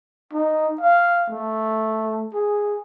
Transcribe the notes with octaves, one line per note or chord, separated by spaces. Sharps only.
D#4
F5
A3
G#4